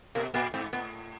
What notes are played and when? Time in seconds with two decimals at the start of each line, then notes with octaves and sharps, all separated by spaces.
0.15 B2 A#3
0.34 A#2 B3
0.54 G#2 C4
0.73 A2 B3